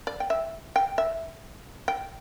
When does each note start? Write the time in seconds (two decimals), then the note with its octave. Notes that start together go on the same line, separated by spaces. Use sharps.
0.07 D5
0.20 G5
0.30 E5
0.76 G5
0.98 E5
1.88 G5